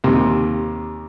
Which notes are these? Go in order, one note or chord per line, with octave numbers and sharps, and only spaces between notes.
D#2 C3